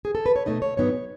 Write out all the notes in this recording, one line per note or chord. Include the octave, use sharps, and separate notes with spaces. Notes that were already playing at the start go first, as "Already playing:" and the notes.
G#4
A4
B4
C#5
B2 A3 D#4 D#5
C#5
G#2 D#3 F#3 B3 D#4 C#5